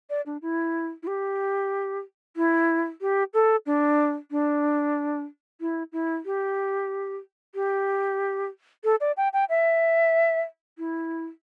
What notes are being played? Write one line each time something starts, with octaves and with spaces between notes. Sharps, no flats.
D5
D4
E4
E4
G4
E4
G4
A4
D4
D4
E4
E4
G4
G4
A4
D5
G5
G5
E5
E4